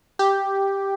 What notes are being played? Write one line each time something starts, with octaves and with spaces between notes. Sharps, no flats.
G4